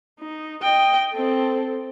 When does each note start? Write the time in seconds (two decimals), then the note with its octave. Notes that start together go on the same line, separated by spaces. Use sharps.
0.19 D#4
0.62 D#5 G5
1.13 C4 A4